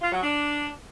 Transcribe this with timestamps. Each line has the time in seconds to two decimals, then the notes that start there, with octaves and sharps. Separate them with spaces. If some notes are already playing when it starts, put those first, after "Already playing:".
0.01 F4
0.12 F#3
0.22 D4